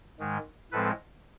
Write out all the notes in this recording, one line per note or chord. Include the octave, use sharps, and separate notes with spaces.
G#2 D#3 G#3
A2 F3 G#3 C4 A4 B4